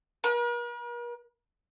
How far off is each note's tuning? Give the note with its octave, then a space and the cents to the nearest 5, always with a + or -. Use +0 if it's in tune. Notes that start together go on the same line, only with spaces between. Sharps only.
A#4 +45